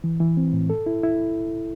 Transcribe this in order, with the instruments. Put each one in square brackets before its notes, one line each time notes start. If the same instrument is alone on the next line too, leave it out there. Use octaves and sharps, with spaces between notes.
[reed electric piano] E3
E3
C4
A2
A4
E4
E4